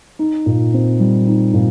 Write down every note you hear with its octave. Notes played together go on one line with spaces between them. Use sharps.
D#4
A#2
C4
G3
D#4
A#2